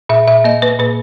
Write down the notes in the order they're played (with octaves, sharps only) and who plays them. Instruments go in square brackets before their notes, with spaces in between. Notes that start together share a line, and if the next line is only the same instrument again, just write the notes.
[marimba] A#2 E5
A#2 E5
A#3 D#5
A#3 B4
A#2 B4